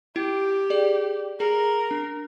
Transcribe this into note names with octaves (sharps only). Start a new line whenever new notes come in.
E4 G4
G#4 D5
G#4 A#4
D4